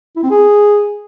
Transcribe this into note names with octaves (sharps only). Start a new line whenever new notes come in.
E4
C4
G#4